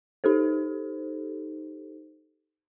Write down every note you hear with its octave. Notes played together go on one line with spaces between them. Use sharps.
D#4 G4 A4 C5